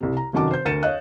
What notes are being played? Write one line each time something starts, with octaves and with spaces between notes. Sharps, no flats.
C2 C3
A#5
F1 F#2 D#3 F#4 A5 D6
C5 G6
D2 A#4 A6 C#7 D#7 E7
C#5 D#5 F5 F#6